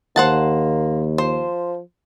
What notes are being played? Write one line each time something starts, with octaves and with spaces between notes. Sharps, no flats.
D#2 A#3 C5 F#5 A5
F3 C5